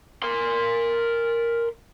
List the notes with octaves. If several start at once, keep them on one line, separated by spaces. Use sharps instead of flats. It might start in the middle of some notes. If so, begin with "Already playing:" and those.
A#4 C6